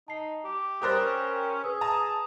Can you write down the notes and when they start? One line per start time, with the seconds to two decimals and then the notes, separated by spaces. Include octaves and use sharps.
0.08 D#4 A5 C7
0.44 G4
0.82 G3 G4 A#4 C5 D#6 F#6 A6
1.01 C#4
1.64 G#4 B4 E6
1.81 A5 A#5 D#6